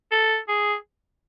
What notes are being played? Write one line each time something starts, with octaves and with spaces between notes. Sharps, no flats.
A4
G#4